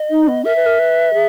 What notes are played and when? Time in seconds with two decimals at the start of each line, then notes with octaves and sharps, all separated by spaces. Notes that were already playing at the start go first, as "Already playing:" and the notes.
Already playing: D#5
0.10 D#4
0.27 B3
0.44 A#4 E5
0.56 B4
0.66 A#4
0.79 B4
1.13 G#4